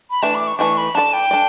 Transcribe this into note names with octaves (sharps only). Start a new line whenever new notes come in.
B5
E3 A3 D4 A5
D6
C#6
E3 A3 D4 C#6
B5
D4 A4 D5 A5
G5
D4 A4 D5